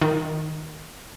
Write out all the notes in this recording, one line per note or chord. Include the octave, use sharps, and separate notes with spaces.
D#3